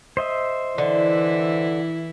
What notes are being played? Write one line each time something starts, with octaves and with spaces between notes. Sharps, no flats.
C5 D#5 E5
D3 E3 E4